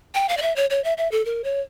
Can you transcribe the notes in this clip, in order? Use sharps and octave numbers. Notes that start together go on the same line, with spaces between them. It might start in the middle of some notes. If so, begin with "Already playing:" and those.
G5
F5
D5
E5
C#5
C#5
E5
E5
A4
A#4
C#5